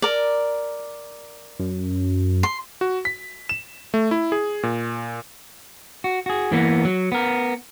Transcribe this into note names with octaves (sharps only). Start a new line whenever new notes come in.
A#4 D5
F#2
C6
F#4
B6
E7
A3
E4
G#4
A#2
F#4
F#4 G#4
E3 A#3 B3
F#3
B3 A#4